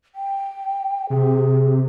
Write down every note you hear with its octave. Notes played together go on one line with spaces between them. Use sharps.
G5
C3 G#4